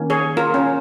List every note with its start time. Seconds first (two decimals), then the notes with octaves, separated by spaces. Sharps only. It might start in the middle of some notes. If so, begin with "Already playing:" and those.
Already playing: D#3 A#3 C#4
0.10 G#4 C#5
0.37 F4 A#4
0.54 C#4